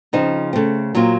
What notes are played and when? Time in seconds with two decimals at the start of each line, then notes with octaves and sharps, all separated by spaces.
0.13 C#3 F3 C4 D#4
0.53 C#3 A3 C4
0.95 A#2 F#3 C4 F4